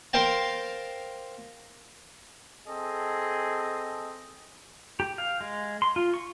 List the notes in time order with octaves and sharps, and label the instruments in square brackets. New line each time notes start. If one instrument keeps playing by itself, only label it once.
[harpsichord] A#4 C5 F5 G5 A5
[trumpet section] C4 G#4 A4 D#5
[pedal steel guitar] G4
F5
G#3
C6
F4
C#6